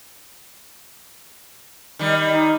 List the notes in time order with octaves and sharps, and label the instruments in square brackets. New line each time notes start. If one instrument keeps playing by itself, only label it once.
[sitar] D#3 G3
[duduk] D#4